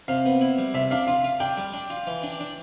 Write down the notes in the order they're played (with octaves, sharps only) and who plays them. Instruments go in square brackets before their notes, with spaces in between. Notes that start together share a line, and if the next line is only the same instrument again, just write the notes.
[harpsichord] C3 [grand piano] F5
[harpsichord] B3
E4
G3
[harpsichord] C3 [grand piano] E5
[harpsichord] D4 [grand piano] F5
[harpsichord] F4 [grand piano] F5
[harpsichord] F4
[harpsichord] D4 [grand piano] G5
[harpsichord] G3
D4
F4
E3
D4
D4